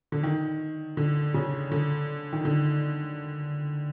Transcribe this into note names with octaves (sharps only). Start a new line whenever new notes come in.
D3
D#3
D3
C#3
D3
D#3
D3